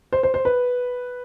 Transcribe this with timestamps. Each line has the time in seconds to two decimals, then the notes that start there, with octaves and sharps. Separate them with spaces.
0.13 C5
0.23 C5
0.34 C5
0.45 B4